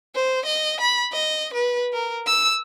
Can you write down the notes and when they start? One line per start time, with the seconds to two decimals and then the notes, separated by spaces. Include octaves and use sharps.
0.15 C5
0.45 D#5
0.80 B5
1.13 D#5
1.54 B4
1.93 A#4
2.27 E6